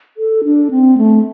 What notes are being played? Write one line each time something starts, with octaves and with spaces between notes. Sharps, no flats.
A4
D4
C4
A3